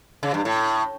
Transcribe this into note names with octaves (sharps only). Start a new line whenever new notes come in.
C#3
G2
A2